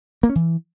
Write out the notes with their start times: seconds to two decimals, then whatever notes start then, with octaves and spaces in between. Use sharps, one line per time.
0.23 A#3
0.29 C#4
0.35 E3